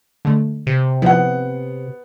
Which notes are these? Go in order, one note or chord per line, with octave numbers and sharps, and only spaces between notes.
D3 G#3 A3
C3
F3 B3 E4 F#5